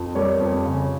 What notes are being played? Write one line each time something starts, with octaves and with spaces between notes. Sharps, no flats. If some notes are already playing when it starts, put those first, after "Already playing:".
Already playing: F2
G3 A#4 C#5
F2
C#3